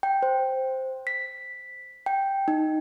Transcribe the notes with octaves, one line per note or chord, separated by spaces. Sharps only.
G5
C5
B6
G5
D#4